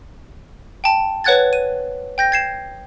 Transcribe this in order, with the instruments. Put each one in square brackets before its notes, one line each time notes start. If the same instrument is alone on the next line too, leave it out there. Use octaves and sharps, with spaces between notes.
[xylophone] G5 A5
B4 C#5 F#5 F#6 G#6 A6
D#7
G5 G6 A#6
G#6 C7 E7